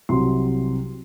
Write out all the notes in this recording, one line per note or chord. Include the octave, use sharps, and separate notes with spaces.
C2 C3 F#3 C4 C6